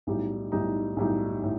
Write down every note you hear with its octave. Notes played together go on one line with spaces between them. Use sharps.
B1 A2 G3 D#4
B1 A2 G3 D#4
B1 A2 G3 D#4
A2